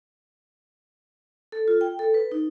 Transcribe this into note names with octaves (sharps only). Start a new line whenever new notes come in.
A4
F4
G5
A4
B4
D#4